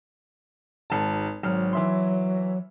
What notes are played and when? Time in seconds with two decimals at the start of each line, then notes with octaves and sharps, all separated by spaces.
0.90 G#1 A5
1.43 G#1 F#3 F6
1.73 E3 E5 C6